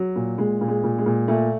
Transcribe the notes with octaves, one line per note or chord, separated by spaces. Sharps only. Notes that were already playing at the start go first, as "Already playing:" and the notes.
Already playing: F#3
A#2
A#2 G#3
A#2
G#3
A#2
G#3
A#2
A#2 A3